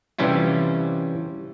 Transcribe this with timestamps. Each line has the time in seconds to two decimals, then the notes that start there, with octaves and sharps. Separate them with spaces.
0.18 C3 E3 G3 C#4 E4 F4